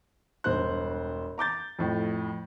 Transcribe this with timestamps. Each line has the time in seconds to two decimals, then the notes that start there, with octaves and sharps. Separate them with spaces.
0.44 E1 G2 C5 F#6
1.38 A#5 D6 G6 A6
1.79 F2 A2